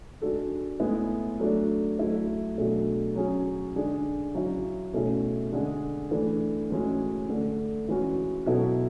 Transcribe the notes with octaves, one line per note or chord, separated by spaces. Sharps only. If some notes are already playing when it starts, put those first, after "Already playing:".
G#3 D4 F#4 A4
A2 G#3 B3 E4 G#4
F#3 A3 D4
F#3 A3 E4 A4
B2 F#3 A3 D4 G#4
F#3 C#4 G#4
D3 G#3 D4 G#4
C#3 F#3 C#4 E4
B2 A3 C#4 E4 G#4
D3 G#3 D4 G#4
E3 A3 D4
A2 E3 G#3 C#4 F#4
D3 A3 D4
E3 G#3 C#4 F#4
B2 F#3 B3 E4 A4